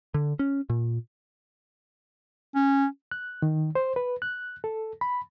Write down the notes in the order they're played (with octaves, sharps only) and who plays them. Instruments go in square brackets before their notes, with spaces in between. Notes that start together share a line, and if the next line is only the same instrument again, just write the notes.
[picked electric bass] D3
C#4
A#2
[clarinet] C#4
[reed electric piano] F#6
D#3
C5
B4
F#6
A4
B5